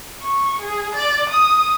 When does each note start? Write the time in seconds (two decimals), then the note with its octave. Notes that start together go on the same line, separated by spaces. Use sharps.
0.23 C#6
0.61 G#4
0.95 D5
1.29 D#6